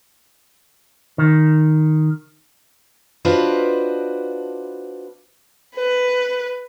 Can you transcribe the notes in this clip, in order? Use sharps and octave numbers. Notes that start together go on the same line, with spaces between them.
D#3
D4 F4 F#4 B4 C5 D#5
B4